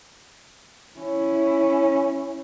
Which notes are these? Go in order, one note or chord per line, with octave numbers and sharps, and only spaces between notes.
C#4 E4